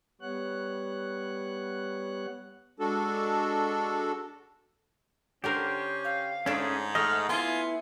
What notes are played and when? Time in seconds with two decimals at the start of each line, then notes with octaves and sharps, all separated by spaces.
0.21 G3 B3 C#5 F#5 F#6
2.80 G#3 D4 F#4 A4
5.44 D3 C#4 D4 G4 A#4 C5
6.04 F5
6.46 G#2 A3 C#4 D4 G#4
6.95 A3 D#5 F#5 F6
7.29 B3 E4 F4 G#5